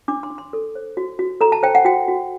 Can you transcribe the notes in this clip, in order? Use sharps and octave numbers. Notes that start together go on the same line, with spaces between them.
D4 D6
C6
D4
C6
A4
C5
F#4
F#4
A4 A#5
A5
C5 G5
F#5
F#4 G5
F#4